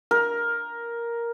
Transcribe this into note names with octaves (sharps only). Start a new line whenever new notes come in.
A#4